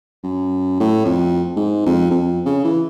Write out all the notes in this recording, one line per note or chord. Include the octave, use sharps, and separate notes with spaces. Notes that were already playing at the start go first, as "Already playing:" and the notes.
F#2
A2
F2
G#2
F2
F2
C#3
E3